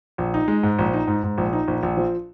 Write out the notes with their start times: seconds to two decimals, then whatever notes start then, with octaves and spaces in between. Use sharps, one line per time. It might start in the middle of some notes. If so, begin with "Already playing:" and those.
0.18 A#1
0.34 D#4
0.48 G#3
0.63 G#2
0.79 A#1
0.93 D#4
1.07 G#2
1.23 G#2
1.38 A#1
1.53 D#4
1.68 A#1
1.83 A#1
1.97 F3